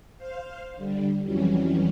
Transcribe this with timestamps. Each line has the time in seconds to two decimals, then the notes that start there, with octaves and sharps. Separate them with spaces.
0.17 C5 F5
0.76 D3 G3
1.22 F2 E3 F#3 G3 C#4